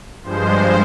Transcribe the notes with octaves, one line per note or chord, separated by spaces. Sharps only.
G2 F3 G#3 C5